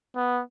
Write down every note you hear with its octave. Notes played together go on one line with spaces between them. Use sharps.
B3